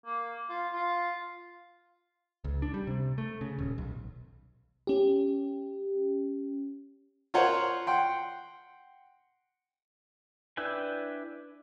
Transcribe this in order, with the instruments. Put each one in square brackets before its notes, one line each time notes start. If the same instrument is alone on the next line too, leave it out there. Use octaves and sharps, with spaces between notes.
[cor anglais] A#3
F4
F4
[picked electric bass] C#2
D4
G3
C3
A3
C#3
D#1
B1
[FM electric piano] C#4 G4
[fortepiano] F4 A#4 C5 C#5 F#5
F#5 G5 C6
[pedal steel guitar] D4 E4 B4 G5 G#5